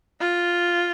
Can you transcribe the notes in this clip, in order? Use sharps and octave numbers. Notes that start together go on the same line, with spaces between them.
F4